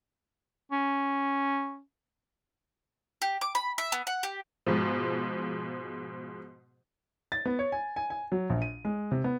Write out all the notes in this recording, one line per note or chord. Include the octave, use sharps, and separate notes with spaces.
C#4
G4
D6
B5
E5
B3
F#5
G4
G#2 B2 F3
A6
B3
C#5
G#5
G#5
G#5
F#3
A#1
D#7
G#3
C3
B3